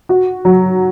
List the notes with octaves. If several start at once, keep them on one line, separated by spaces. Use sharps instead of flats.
F#4
F#3